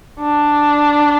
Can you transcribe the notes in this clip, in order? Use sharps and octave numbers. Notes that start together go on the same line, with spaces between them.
D4